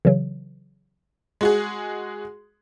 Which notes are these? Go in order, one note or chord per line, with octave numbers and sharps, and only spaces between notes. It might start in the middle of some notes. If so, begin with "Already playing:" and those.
C#3 E3 F#3
G#3 F#4 G#4